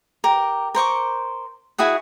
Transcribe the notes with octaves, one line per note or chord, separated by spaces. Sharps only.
G4 A#4
A#4 C5 C#6 D6
E4 F#4 G#4 F#5